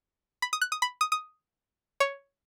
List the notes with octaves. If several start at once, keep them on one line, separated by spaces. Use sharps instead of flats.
B5
D#6
F#6
D#6
B5
D#6
D#6
C#5